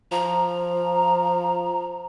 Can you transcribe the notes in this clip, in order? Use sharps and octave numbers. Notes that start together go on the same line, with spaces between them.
F3 A#5